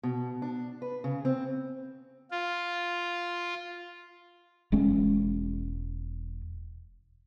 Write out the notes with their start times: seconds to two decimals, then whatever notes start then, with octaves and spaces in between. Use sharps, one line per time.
0.03 B2
0.42 D4
0.82 B4
1.04 C#3
1.25 C4
2.31 F4
4.72 E1 G#3 C#4